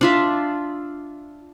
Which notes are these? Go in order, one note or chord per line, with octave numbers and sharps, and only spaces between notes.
D4 F4 E5